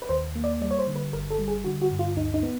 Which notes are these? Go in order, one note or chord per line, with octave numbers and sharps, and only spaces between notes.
B4
D#2 C5
A#3
D5
G3 D5
C#5
C5
D3
B4
G1 A#4
A4
G3
G#4
D3 F#4
F#4
G2
F4
D2 D#4
D#4
B3